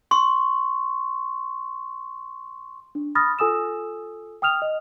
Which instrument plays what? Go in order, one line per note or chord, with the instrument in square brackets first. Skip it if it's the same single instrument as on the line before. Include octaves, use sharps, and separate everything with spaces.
[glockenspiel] C6 C#6
[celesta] D4
B5 D#6 F6 A6 A#6
F4 A4 G#5 D#6 E6 E7
G5 D#6 F6 F7
D#5